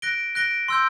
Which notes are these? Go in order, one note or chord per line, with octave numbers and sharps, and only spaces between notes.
F#6 A#6 D7 G7
F#6 A#6 D7 G7
C6 E6 G6